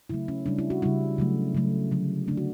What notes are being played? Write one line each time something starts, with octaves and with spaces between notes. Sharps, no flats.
C#3 F#3 A3 E4
C#4
C#3 G3 D4
E4
F#4
C#3 G3 E4
C#3 F#3 A3
C#3 F#3 A3
D3 F#3 A3
D3 F#3 A3 D4
F#4